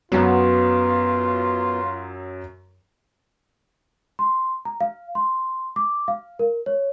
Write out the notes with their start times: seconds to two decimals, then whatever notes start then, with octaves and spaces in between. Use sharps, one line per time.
0.12 F#2 F#3 B3 F4
4.19 C6
4.65 A#5
4.81 F5
5.15 C6
5.76 D6
6.08 F5
6.39 A#4
6.66 C#5